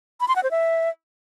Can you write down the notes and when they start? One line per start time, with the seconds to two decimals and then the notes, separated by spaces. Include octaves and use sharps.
0.21 B5
0.28 C6
0.36 F#5
0.43 C5
0.51 E5